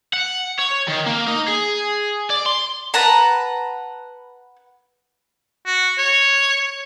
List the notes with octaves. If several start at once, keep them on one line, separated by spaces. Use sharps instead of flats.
F#5
C#5
D#3
A#3
D#4
G#4
D5
C6
B4 F#5 A5 A#5
F#4
C#5